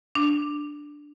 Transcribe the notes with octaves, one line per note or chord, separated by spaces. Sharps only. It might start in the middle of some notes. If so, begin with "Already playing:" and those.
D4